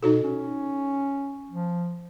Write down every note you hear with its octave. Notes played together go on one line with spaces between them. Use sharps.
B2 D#4 F#4 A4
C#4
F3